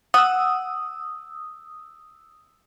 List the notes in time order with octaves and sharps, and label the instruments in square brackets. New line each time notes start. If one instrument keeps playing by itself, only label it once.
[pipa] F#5 [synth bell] D#6 E6